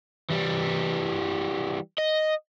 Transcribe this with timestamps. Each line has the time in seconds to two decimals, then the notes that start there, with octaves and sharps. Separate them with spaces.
0.30 E3 G3
1.98 D#5